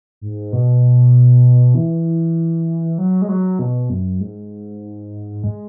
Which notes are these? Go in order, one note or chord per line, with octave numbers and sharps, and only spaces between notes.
G#2
B2
E3
F#3
G#3
F#3
B2
F#2
G#2
G#3